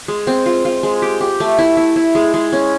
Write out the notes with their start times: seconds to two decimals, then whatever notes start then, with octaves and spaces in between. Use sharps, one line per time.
0.08 G#3
0.27 C4
0.46 F4
0.65 F4
0.83 G#3
1.02 G4
1.21 G4
1.40 A3
1.59 E4
1.77 E4
1.96 E4
2.15 G#3
2.34 G#3
2.53 C#4